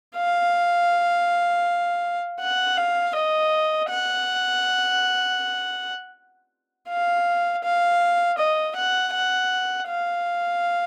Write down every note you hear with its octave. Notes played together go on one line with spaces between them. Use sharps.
F5
F#5
F5
D#5
F#5
F5
F5
D#5
F#5
F#5
F5